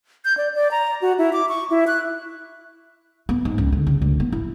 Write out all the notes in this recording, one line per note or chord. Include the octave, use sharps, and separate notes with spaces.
G6
D5
D5
A#5
F#4
E4
D6
C#6
E4
F#6
B3
G#2
C#2
D3
C#3
D2
B3
E4